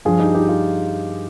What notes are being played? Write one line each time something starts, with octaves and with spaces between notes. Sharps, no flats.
G2 F3 F4 G#4
D#4 G4
D#4 G4
F4 G#4